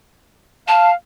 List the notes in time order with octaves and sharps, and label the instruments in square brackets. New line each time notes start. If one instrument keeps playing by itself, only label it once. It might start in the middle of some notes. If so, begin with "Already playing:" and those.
[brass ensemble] F5 [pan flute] A5